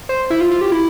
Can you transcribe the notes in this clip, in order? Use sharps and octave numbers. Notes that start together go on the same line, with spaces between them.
C5
E4
F4
F4
G4
E4